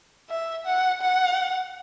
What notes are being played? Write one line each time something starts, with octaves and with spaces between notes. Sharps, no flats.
E5
F#5
F#5